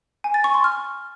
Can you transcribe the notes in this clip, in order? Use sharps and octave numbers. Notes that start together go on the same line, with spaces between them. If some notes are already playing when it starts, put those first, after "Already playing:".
G#5
A6
C#6
C6
F6